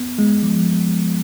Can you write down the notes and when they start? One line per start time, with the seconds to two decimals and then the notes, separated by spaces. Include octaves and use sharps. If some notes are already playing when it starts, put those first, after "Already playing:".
Already playing: B3
0.19 G#3
0.43 F3